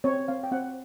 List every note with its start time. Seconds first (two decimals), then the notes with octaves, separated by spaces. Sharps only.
0.04 C4 C#5
0.28 C4 F5
0.43 G5
0.52 C4 F#5